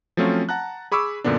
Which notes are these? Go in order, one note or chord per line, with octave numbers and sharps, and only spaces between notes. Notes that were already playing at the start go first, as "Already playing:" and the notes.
F3 F#3 A3 C4 C#4 F4
F#5 A5 A#5 F#6
G#4 B5 C#6 D6 E6
F#2 A#2 D3 B3 D4